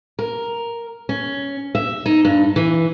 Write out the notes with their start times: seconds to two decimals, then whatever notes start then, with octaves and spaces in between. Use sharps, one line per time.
0.19 A#4
1.09 C#4
1.75 E5
2.06 D#4
2.25 G2
2.56 E3